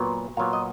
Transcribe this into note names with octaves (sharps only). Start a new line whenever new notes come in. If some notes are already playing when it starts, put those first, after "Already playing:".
Already playing: A#2 F#3 B3
A#2 F#3 B3 F5
D#5